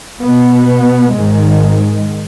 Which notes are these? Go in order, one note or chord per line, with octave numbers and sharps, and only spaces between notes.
B2 B3
G#2 D#3 G#3